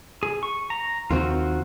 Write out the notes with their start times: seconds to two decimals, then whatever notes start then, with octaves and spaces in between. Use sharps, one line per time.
0.23 G#4
0.43 C#6
0.70 A#5
1.11 D#2 D#3 C4 F4 F#4